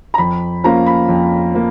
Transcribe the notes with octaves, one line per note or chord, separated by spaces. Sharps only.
A#5
F2 B5
F3 A#3 C#4 A#5
B5
F2
F3 A#3